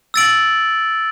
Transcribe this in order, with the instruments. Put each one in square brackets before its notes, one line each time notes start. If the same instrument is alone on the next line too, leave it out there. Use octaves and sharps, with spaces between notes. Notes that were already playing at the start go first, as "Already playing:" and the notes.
[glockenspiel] E6 A6 D7 F#7